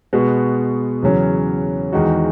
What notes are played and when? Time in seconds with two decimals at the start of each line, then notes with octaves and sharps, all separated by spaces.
0.13 B2 G#3 B3 F#4
1.02 E2 C#3 F#3 C#4
1.93 E2 D#3 G#3 D#4 F#4